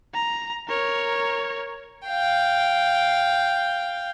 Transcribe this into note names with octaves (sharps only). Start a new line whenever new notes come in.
A#5
A#4 C#5
F5 G5